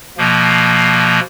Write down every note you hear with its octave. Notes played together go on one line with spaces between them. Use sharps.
B2 F3 A#3